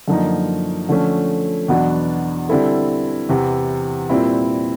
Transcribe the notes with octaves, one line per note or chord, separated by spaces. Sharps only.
F#2 D3 F3 A#3 D#4
D3 F3 A3 C#4
E2 B2 F#3 B3 D4
D3 G3 C4 E4 A4
E2 C3 E3
A#2 G3 C4 E4